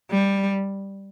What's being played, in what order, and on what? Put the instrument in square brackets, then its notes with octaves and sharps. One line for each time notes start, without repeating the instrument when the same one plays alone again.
[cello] G3